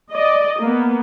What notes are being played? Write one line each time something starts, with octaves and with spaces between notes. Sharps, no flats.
D5 D#5
A#3 B3